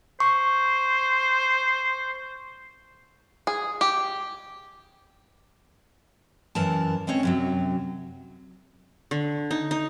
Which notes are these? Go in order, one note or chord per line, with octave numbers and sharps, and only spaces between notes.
C5 C#6
G#4
G4
F#2 E3 A#4 A5
G#3 C4 C#4 C#5
F#2 C3 F#3
D3
D#4
D#4